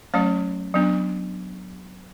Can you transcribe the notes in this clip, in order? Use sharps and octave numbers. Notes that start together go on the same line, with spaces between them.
F#3 A3 C#4 C#5
F#3 B3 D4